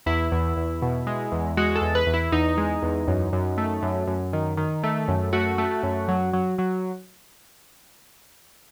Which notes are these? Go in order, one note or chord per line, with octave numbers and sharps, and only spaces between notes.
E2 E4
E2
E2
B2
G#3
E2
G#3 F#4
A4
E2
B4
E2
E4
E2 D#4
G#3
E2
F#2
F#2
A3
F#2
F#2
D#3
D#3
A3
F#2
A3 F#4
A3
F#2
F#3
F#3
F#3